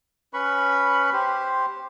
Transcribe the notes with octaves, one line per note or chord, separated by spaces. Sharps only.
C#4 B4 B5 C#6
G4 C5